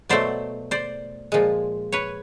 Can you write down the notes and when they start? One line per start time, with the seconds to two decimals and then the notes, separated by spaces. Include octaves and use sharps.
0.09 B2 F#3 A3 C5 D5
0.71 C5 D5
1.32 A#2 F3 G#3
1.92 B4 C#5